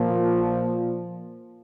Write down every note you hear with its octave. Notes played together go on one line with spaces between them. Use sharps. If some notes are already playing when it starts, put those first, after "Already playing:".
Already playing: A#2 F3